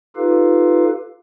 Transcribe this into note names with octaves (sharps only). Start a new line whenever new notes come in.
D#4 F4 G4 A4 B4 F5